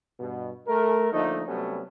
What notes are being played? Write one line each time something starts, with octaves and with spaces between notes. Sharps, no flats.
G2 B2
A3 A#4
D3 F3 A3 A#3 D#4
C3 F#3 G3 A3 B3 C#4